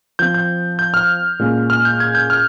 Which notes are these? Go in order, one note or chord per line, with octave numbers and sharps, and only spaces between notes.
F3 C4 G6
G6
G6
F6
A#2 G#3 C#4
F6
G6
G#6
G6
F6